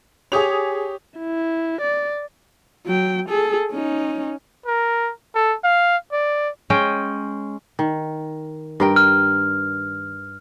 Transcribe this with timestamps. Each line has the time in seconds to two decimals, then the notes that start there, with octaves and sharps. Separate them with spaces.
0.32 G4 G#4 C#5 D#6 F7
1.19 E4
1.81 D5
2.86 F#3 G5
3.29 G#4 A4
3.71 C#4 D#4
4.66 A#4
5.35 A4
5.64 F5
6.12 D5
6.70 G#3 C#4 G5
7.79 D#3
8.80 G2 A#4 G5
8.96 F6